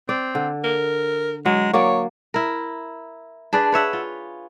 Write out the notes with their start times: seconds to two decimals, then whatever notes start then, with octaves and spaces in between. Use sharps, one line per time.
0.09 C4 D5
0.35 D3
0.64 A#4
1.46 F#3 G#3
1.73 F#3 A#3 C#5 D5
2.34 E4 A#4
3.53 D4 G#4 B4 D5
3.72 B4 C#5 E5 F#5
3.93 F4